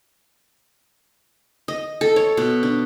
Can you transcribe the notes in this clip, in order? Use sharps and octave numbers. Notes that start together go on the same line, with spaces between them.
D#5
A4
C#5
B2
D4